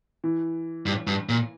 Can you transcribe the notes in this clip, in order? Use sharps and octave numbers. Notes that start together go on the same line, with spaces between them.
E3
G2
G2
A#2